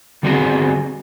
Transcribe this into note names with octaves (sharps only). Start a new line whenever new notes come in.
D3 G3 B3 C4 F#4 G#4